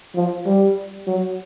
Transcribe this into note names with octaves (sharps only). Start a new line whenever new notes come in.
F3
G3
F#3